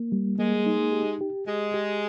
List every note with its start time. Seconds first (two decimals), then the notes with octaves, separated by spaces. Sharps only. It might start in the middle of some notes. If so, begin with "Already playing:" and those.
Already playing: A#3
0.12 G3
0.39 G#3 A#3
0.66 D#4
0.93 G4
1.21 G4
1.47 G#3 G4
1.74 G4